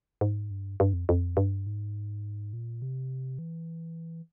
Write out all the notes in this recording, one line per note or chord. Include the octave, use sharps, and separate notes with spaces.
G#2
G2
G2
F2
F2
G2
G#2
A#2
C3
E3